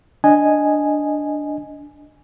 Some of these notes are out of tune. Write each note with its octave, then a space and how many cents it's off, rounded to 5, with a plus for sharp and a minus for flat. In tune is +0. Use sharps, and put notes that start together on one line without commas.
D4 +0 D#5 +0 G#5 +0